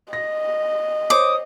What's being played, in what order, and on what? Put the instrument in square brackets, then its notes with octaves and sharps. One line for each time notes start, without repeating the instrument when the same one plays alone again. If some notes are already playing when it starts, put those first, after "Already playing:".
[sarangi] D#5 [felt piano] A#6
[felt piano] C5 C#5 [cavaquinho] D6 [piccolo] D#6